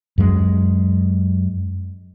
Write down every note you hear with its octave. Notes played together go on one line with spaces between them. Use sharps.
F#2 F#3 G#3